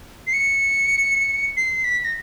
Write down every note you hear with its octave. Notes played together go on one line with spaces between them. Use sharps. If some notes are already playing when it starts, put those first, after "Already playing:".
C7
C#7
C7
B6
A#6